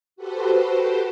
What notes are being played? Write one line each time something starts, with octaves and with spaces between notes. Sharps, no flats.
F#4 G4 A4 B4 C5